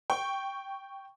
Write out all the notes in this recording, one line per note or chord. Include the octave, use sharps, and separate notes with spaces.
G5 C#6